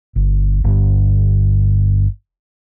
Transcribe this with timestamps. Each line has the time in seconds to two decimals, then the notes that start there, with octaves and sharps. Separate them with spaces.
0.16 G1
0.64 G1